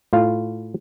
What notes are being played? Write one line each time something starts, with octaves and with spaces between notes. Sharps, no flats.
A2 F4 F5